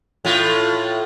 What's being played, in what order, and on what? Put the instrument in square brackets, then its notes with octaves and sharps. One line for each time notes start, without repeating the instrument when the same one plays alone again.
[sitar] A2 F4